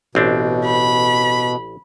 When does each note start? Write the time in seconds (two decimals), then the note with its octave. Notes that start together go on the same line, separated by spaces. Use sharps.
0.15 A1 B2 C4 D4
0.65 B5